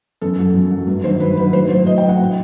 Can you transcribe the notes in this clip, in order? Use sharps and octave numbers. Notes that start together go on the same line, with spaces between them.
F#2 A4
F#3
F#2
F#3
G2
D#3 F#3 C5
G2 B4
D#3 F#3 B4
A2 C5
F#3 C5
A2 D#5
F#3 G5
F#5
A2